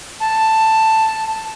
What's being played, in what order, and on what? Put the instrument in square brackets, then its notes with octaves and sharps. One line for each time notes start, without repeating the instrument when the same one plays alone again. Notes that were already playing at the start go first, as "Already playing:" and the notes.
[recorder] A5